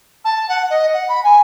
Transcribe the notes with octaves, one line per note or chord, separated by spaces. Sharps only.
A5
F#5
D#5
F#5
B5
G#5